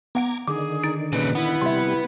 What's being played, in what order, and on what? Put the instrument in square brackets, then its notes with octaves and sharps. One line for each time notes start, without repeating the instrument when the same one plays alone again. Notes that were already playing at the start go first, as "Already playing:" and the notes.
[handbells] B3 F#5 D7 [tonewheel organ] A#5 D6 G#6
[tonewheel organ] D3 D#3 [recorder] G#4 [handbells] D6
[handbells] D#4 A6 D7
[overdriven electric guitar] A#2 C#3 [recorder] B4
[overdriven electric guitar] B3 [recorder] E4
[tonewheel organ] C3 G3 [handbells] E5 C6